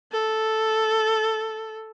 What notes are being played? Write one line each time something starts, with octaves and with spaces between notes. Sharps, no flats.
A4